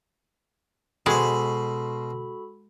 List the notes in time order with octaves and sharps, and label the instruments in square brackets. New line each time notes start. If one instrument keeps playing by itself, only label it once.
[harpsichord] B2 C5 [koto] G#3 [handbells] F#4 A4 B5